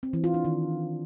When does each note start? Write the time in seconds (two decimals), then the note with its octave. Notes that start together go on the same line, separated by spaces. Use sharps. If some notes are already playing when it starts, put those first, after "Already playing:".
0.03 C4
0.13 E3
0.24 F4
0.34 D4
0.45 D#3